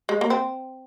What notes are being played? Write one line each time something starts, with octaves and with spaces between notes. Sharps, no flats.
G#3
A#3
C4